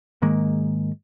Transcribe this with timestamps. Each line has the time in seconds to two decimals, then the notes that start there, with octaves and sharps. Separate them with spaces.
0.22 G#2 D#3 G#3 A#3